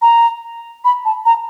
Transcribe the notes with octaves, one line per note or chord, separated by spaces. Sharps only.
A#5
B5
A5
A#5